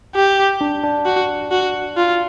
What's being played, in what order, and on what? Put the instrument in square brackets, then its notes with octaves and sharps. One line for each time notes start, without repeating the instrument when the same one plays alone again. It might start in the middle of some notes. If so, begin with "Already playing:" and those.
[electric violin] G4
[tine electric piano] D4
D4
[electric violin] F#4
F#4
F4